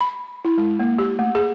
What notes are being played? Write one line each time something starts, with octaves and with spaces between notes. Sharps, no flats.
B5
E4
G#3
A#3
G4
A3
G#4